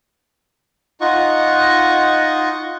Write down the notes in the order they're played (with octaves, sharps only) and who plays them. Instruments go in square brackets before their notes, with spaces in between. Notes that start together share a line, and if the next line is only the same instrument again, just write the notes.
[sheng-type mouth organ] D#4 F4 D#5 F#5 C#6